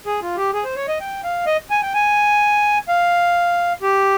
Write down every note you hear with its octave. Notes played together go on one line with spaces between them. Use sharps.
G#4
F4
G4
G#4
C5
C#5
D#5
G5
F5
D#5
G#5
G5
G#5
F5
G4